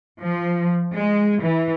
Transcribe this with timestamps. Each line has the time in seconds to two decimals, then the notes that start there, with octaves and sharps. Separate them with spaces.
0.21 F3
0.94 G#3
1.42 E3